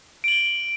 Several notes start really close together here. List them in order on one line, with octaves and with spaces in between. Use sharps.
D7 F#7 G7